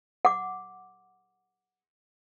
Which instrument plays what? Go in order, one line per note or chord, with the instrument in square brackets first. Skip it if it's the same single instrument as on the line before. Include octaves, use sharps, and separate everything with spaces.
[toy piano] F#5 D6